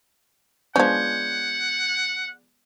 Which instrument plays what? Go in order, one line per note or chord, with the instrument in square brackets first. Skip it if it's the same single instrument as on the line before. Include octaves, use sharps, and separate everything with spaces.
[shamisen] F3 C#4 [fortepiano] G#3 B3 D4 [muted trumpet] F#5 [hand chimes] G6 G#6